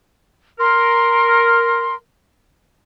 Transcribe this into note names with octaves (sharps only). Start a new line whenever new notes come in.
A#4 C6